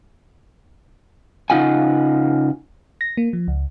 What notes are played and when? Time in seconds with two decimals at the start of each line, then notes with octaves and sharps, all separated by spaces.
1.50 C#3 D#4 F4 F#5 G#5
3.01 A#6
3.17 A#3
3.33 F3
3.48 C#2